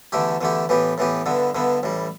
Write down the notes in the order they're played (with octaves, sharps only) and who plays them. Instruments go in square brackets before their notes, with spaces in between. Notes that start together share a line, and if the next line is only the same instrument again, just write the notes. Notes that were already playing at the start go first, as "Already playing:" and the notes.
[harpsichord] E2 D3 A3 E4 G4
E2 D3 A3 E4 G4
A2 E3 B3 G4
A2 E3 B3 G4
G2 D3 B3 E4
G2 D3 B3 E4
A1 A2 G3